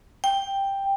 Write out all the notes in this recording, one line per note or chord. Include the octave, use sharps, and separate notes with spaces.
G5